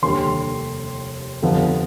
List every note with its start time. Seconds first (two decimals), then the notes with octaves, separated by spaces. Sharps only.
0.02 F1 D#2 D3 G3 C6
1.42 G1 F2 C3 F3 B3